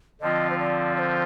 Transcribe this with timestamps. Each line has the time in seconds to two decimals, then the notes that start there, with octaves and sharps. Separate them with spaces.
0.21 D3 F3 C4 F4 D#5
0.50 C5
0.59 D5
0.95 D5
0.99 C5